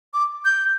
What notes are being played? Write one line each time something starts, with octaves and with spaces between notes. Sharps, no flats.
D6
G6